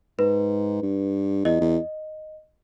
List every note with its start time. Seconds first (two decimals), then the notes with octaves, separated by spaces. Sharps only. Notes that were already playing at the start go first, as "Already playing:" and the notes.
0.19 G#2 B4
0.82 G2
1.45 E2 D#5
1.61 E2